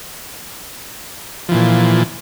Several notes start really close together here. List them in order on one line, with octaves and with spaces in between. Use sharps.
F3 E3 A#2